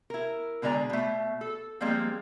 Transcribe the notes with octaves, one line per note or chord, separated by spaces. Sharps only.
E4 A#4
B2 D3 G#3 D5 A#5
B2 A3
A4
F3 G3 G#3 A#3 C4